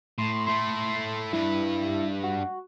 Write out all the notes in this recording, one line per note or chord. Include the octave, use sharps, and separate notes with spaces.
A2 C6
A3 E4 C6
G2 E4 B4
F#4